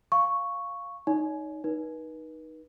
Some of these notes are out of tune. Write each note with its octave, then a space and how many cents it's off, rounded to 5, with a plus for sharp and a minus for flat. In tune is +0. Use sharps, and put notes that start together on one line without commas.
F5 +0 C#6 +0
D#4 +0 C#5 +35
D#4 +0 B4 -35